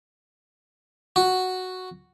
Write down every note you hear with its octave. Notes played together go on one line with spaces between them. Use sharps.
F#4